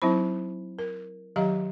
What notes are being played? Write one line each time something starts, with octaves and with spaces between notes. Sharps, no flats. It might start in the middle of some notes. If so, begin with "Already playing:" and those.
F#3 C4 D#4 E4 C5 B5
A#4
D#3 F#3 G4 D#5 F5 A#5